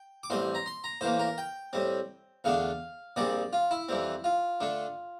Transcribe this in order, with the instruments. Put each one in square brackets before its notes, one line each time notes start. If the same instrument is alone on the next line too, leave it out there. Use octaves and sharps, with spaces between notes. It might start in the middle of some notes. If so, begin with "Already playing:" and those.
Already playing: [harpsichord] G5
D6
A1 A2 G3 C4 C6
A#5
C6
A#5
A2 E3 A#3 C5
A#4
G5
A2 G3 C4
E2 D3 A3 D4 F5
A#1 A#2 G3 C4 D5
F4
E4
F2 E3 G3 C4
F4
D3 A3 D4